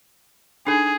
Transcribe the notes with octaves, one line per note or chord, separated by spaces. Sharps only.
D4 D#4 G#4 A4